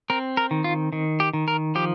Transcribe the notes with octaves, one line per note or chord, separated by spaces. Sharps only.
C4 A#4
A#4
D#3
F4
D#3
G4
D#3
A#4
F3 G4